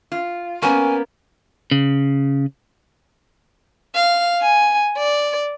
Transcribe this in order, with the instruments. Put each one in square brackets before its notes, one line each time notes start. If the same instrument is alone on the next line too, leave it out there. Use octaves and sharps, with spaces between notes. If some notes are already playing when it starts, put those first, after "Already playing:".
[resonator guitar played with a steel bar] F4
[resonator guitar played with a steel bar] A#3 B3 [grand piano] C#4 [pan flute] G#5
[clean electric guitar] C#3
[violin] F5
G#5
D5